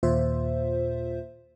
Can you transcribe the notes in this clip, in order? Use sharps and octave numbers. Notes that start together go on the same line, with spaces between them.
D#2 A#2 F4 C5 E5